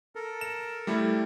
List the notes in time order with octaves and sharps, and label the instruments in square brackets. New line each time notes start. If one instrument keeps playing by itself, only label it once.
[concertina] A4 A#4
[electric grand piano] E7
G3 A3 E4